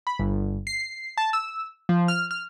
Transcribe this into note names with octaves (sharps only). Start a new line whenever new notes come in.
B5
G1
C7
A5
E6
F3
F6
F6